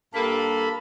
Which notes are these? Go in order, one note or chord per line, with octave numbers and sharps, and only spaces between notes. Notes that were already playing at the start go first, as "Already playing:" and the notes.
G2 A#3 A4 B5